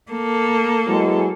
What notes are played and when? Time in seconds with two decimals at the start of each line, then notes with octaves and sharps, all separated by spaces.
0.13 A#3 A4
0.87 E3 F#3 G#3